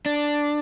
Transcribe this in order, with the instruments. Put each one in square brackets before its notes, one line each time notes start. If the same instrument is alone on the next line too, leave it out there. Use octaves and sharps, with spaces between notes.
[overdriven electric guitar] D4